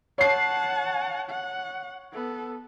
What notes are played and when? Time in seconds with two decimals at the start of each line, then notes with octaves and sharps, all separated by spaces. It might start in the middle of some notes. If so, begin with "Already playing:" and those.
0.18 C#5 F#5 A5 C7
1.30 F#5
2.13 B3 A4